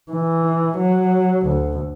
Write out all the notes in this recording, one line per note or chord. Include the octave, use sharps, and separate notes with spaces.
E3
F#3
D2